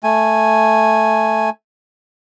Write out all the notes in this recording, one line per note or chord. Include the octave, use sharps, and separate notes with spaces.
A3 G#5